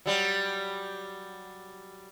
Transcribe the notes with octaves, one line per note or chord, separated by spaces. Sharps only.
F#3 G3